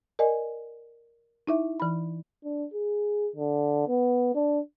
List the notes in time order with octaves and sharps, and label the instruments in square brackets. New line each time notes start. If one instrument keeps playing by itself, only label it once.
[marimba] A#4 D5 D#5 G#5
D#4 E4 E5
E3 B5
[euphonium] D4
G#4
D3
B3
D4